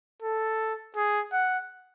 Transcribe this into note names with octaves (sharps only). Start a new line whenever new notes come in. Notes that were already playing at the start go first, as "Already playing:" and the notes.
A4
G#4
F#5